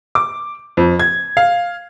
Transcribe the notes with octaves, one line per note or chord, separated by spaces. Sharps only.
D6
F2
G#6
F5